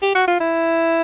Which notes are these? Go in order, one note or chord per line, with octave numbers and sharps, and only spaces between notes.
G4
F#4
F4
E4